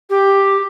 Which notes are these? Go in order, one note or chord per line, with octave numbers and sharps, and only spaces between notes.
G4